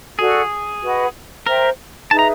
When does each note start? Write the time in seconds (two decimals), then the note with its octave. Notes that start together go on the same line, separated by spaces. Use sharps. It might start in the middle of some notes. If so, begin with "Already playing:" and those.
0.19 F#4 G#4 A4 D5
0.82 F#4 B4 D#5 F#5
1.46 A#4 C5 E5 G5 A#5
2.10 D#4 G#4 B4 E5 A5
2.19 A#5